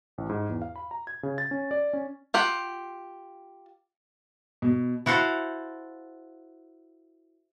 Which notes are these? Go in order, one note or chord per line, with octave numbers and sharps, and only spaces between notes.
A1
G#2
E2
F5
B5
A#5
G#6
C#3
A6
C#4
D5
C#4
F4 G4 F#5
B2
E4 F#4 A4 C5 F5